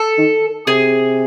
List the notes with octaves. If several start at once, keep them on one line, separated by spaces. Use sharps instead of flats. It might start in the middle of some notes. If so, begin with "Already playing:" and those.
Already playing: A4
D#3
C3 G#4